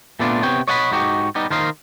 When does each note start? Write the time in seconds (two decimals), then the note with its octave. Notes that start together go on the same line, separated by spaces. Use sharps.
0.19 A#2 A3 B3 D4 F4
0.43 C3 B3 C#5 G5
0.68 C#5 D#5 F#5 A5 B5
0.92 G#2 D#4 F#4 G4
1.35 G3 B3 D#4
1.51 D#3 A#4 C5 D#5 F5